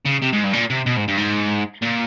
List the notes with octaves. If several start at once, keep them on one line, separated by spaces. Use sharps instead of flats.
C#3
C3
G#2
G2
A#2
C3
B2
G#2
G2
G#2
A#2